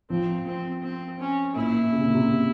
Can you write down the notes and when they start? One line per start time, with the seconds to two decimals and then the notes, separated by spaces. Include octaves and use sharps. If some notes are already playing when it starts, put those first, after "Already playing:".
0.10 F3 C4
0.47 C4
0.83 C4
1.20 C#4
1.55 A#2 E4
1.92 C#3
1.99 C3
2.06 A#2
2.14 C3